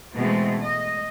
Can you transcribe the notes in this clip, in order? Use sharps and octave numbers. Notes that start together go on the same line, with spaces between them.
B2 E3 G#3 A3 C4
D#5